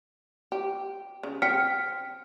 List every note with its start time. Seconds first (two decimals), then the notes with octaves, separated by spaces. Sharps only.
0.52 G4
1.23 C#3
1.42 C4 G5 F6 B6 C#7